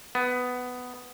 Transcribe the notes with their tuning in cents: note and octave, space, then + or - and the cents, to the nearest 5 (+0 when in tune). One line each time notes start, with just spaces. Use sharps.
B3 +10